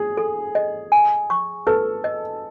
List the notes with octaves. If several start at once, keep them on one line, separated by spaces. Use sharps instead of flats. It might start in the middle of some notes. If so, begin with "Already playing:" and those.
Already playing: G#4
A4
D#5
G#5
C#6
A4 B4
D#5